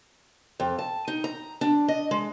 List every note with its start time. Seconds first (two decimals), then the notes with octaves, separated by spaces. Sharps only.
0.60 F2
0.79 A5
1.08 D#4
1.24 A#5
1.61 D4
1.88 D#5
2.11 G#3